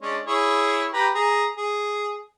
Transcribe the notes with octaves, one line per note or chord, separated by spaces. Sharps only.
G#3 C#4 D4
E4 G#4 C#5
G4 B4 A#5
G#4 A#5
G#4